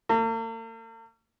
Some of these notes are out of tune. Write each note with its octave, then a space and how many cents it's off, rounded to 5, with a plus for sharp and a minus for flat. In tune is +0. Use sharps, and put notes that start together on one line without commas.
A#3 -45